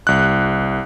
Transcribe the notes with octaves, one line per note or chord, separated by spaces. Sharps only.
C2 F#6